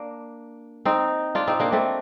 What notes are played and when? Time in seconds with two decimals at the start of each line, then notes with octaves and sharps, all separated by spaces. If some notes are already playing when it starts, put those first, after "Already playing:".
Already playing: A#3 D4
0.85 C4 D#4
1.35 D4 F4
1.47 C4 D#4
1.60 A#3 D4
1.72 A3 C4